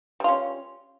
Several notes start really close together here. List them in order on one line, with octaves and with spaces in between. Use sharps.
G3 F4 C#4